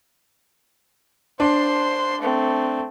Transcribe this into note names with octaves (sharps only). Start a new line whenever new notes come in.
D4 C5 C6
A3 C4